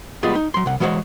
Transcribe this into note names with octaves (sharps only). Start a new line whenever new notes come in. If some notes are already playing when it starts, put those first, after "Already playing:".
G3 G#3 B3 F4 G#4
D#4
F#3 C6
C2 F#5
E3 G#3 F#4 C5 C#5